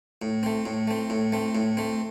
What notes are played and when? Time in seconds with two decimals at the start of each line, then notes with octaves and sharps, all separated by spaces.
0.22 A2
0.43 A3 C4
0.66 A2
0.87 A3 C4
1.10 A2
1.32 A3 C4
1.55 A2
1.77 A3 C4